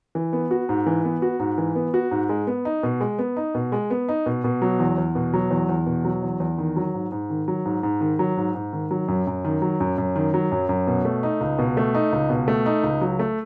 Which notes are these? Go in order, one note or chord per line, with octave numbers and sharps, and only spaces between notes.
E3
B3
F#4
G#2
E3
B3
F#4
G#2
E3
B3
F#4
G#2
G#3
B3
D#4
B2
G#3
B3
D#4
B2
G#3
B3
D#4
B2
B2
F#3
E2
E2
B2
F#3
E2
E2
B2
F#3
E2
E2
D#3
F#3
G#2
G#2
D#3
F#3
G#2
G#2
D#3
F#3
G#2
G#2
D#3
F#3
F#2
F#2
D#3
F#3
F#2
F#2
D#3
F#3
F#2
F#2
B2
A3
D#4
C#2
B2
A3
D#4
C#2
B2
A3
D#4
C#2
F#3
A3